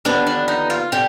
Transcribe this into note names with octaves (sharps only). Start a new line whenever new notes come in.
D#2 D3 F3 B3 D4
D4
D#4
F4
D3 G4